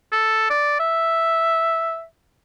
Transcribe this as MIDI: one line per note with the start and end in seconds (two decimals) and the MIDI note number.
0.12 0.48 69
0.50 0.79 74
0.80 2.04 76